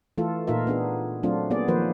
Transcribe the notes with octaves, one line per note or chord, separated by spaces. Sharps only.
E3 A3 F4 A4
A#2 D#4 F4 A#4 E5
B3 D4 G#4
F#3 A3 C4 D4 F4
A#3 B3 G#4 D5
D#3 F3 A#3 B4 C5